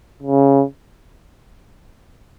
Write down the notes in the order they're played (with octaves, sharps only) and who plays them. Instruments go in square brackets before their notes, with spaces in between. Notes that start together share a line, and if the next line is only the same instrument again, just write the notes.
[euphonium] C#3